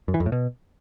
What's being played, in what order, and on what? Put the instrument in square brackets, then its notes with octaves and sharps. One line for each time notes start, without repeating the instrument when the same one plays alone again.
[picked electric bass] F#2
E3
F2
A2
B2